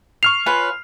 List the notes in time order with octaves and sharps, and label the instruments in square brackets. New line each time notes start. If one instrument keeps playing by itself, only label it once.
[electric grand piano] C#6 F6 C7 [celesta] F7
[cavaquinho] F4 B4 C#5 [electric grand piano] G#5